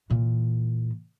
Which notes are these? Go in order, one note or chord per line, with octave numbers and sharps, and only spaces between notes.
A#2 E3